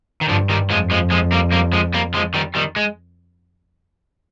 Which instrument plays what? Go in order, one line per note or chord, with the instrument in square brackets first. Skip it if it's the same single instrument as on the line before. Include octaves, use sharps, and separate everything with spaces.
[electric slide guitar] D#3
[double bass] G2 [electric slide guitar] D3 F3
[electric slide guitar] D#3 G3
[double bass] F2 [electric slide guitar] F3 G#3
[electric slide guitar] F3 G#3
F3 G#3
G3 A#3
G3 A#3
F3 G#3
G3 A#3
F3 G#3
D#3 G3
D#3 G3
G#3